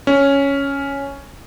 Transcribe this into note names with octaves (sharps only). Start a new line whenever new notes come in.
C#4